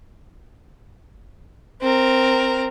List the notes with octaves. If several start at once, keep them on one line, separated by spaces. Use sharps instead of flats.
C4 A#4